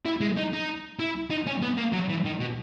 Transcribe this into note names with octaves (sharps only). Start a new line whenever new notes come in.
E4
G#3
D#4
D#4
E4
D#4
C#4
B3
A#3
F#3
E3
D#3
B2